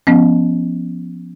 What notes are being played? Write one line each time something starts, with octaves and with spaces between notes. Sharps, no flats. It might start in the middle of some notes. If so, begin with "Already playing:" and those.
F3 B3 C#4